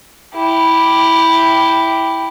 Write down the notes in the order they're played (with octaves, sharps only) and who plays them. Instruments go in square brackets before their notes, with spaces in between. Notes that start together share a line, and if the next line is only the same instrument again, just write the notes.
[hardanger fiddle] E4 G4